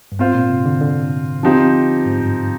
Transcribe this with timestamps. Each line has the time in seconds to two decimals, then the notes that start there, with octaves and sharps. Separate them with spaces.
0.12 G2
0.19 G#2 C4 F4 C5
0.35 A#2
0.50 C3
0.65 D3
0.81 D3
1.43 F3 C4 D#4 G4
2.06 G#2
2.21 G2